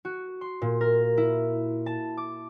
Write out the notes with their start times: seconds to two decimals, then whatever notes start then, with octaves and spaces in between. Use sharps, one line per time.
0.05 F#4
0.41 C6
0.62 A#2
0.81 A#4
1.17 E4
1.86 A5
2.17 D6